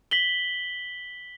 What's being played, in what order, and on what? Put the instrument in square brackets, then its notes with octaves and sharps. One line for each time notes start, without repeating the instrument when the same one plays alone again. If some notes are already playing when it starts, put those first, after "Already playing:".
[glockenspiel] B6 F#7 G7